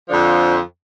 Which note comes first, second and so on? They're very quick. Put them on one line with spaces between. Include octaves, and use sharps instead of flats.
F3 D3 F2